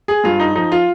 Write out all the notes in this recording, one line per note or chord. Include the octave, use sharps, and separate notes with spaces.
G#4
G2 F4
D#4
F3 D#4
F4